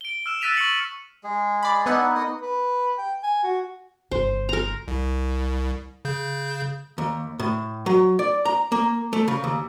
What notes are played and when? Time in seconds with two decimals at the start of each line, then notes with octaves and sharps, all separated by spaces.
0.01 D7 G7
0.26 E6 F6 E7
0.41 E6 F#6 A6 B6 D#7 F7
0.57 C#6 E6 F6 B6 C#7 F#7
1.24 G#3 G#4
1.63 D5 B5
1.86 B3 D4 D#4 E5 F#5 G#5
2.15 A#3 D#5 D#6
2.41 B4
2.98 G5
3.23 G#5
3.44 F#4
4.11 G1 C#3 C5
4.49 A#4 A#5
4.88 C2
6.05 C#3 G6
6.98 D#2
7.39 A2
7.86 F#3
8.19 D5
8.45 A#5
8.72 A#3
9.13 A3
9.28 C#3
9.44 D#2